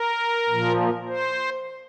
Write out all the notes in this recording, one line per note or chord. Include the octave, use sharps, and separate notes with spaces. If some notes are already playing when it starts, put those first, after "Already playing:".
Already playing: A#4
A#2 F3
C5